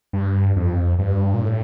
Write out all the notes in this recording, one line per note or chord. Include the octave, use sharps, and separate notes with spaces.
G2
F2
G2
A#2
A2